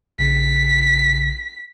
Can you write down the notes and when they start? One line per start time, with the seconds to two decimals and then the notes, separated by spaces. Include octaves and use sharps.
0.19 A#1 C#3 B6